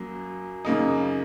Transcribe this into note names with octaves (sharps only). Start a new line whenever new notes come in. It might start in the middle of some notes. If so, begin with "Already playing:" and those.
Already playing: F#2 F#3 A#3
F#2 C#3 A#3 D#4